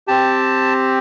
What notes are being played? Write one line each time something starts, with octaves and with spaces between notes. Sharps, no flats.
C4 G4 A5